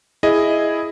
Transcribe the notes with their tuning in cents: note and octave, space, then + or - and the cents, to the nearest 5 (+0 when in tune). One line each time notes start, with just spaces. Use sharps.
E4 +0 G#4 +0 D#5 +0